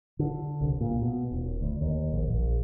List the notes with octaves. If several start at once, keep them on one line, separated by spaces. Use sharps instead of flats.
D3
C2
A#2
B2
D#1
D2
D#2
A#1
A#1